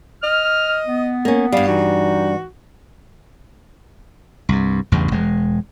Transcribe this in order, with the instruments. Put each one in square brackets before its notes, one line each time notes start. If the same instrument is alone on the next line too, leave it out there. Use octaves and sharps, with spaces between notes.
[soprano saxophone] D#5 [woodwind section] F6
[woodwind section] B3
[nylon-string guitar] A#3 C#4
[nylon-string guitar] G2 G3 [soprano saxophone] F5
[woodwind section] E3 D#4 [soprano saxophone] F#4
[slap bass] C2 G2
A1 E2 G2 C#3
E1 G#3